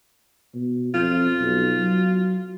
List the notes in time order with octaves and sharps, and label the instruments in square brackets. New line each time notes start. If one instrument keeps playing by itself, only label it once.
[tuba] B2
[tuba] F2 [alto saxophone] F4
[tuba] B1
F#3